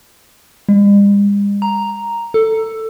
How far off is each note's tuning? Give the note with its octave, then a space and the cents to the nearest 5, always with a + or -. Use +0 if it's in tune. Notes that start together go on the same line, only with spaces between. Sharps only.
G#3 -45
A#5 +0
A4 +10